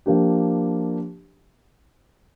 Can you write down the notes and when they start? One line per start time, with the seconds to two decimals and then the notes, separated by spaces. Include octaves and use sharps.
0.06 F3 A#3 D4 G4